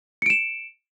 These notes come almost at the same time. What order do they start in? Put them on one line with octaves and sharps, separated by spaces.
C#7 D7 E7